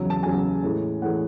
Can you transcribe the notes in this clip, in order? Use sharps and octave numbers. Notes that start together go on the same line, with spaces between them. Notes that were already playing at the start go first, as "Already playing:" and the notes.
Already playing: E2 C#3 F#3
A5
E2 C#3 F#3 G#5
A2 E3 G#3
A2 E3 G#3 F#5